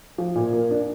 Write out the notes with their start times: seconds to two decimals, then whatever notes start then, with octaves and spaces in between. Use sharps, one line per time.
0.18 F3
0.35 A#2
0.53 A#3
0.71 D4